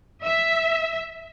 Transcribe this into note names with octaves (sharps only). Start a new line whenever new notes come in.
E5